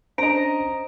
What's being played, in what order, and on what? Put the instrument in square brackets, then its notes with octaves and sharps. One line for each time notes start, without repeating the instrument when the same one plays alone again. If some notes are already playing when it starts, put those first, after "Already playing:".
[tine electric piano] C#4 D4 [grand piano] C5 [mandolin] D#5 A#5 [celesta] D7